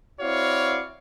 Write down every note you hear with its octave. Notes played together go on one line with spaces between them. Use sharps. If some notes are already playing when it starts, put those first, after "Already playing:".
C4 E4 F#4 C#5 D5 F5